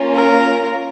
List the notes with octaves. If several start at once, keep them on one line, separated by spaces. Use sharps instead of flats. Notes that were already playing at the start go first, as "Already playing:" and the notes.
Already playing: A#3 C#4 F4
A#4